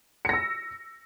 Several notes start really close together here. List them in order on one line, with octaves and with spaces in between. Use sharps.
C#7 A#6 E6